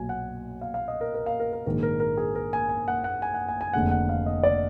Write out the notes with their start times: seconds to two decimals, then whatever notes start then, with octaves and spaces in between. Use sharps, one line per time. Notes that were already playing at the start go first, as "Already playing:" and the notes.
Already playing: B1 A#2 F#3 G#5
0.09 F#5
0.61 F5
0.74 F5
0.88 D#5
1.01 A#4
1.14 A#4
1.26 F5
1.40 A#4
1.53 A#4
1.66 A#1 G#2 D#3 A#4
1.83 A#4
2.00 A#4
2.17 G#4
2.35 A#4
2.53 G#5
2.69 G#5
2.88 F#5
3.04 F#5
3.22 G#5
3.34 F#5
3.49 G#5
3.61 G#5
3.73 F1 D#2 D3 G#3 F#5
3.91 F#5
4.09 F5
4.26 D#5
4.43 D5